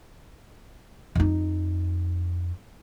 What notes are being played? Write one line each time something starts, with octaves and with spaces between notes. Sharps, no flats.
F2 D#4